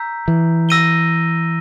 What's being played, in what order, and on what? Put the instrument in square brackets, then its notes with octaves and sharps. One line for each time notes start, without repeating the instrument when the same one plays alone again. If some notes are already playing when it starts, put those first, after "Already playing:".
Already playing: [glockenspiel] A#5 E6 G6 B6
[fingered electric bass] E3
[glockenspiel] E6 A#6 D#7 G7